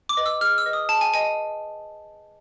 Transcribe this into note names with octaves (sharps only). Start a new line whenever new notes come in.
D6
B4 D#5
E6
G#4 F6
E6
B4 D#5
D#6
G#4 A5
G#5
B4 D#5 G#5